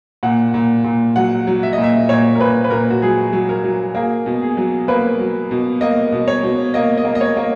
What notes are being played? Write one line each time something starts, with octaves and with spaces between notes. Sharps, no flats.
A#2 F#5
A#2
A#2
F#3 F#5
F#3
E5
A#2 D#5
E5
A#2 C#5
A#4
A#2 B4
B4
A#2 A#4
F#4
F#3 G#4
F#3
A#4
F#3
A#3 G#4
B2
G#4
F#3
A#3 B4
F#3
B2
A#3 D#5
B2
C#5
B2
A#3 D#5
D#5
A#3
D#5
C#5
A#3